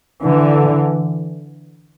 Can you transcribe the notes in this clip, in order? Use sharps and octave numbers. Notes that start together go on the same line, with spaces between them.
D3 E3